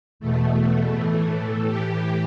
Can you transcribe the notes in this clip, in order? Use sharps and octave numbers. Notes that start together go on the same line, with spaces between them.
E2 B2 A3
A2 E3 A3
A2 E3 G4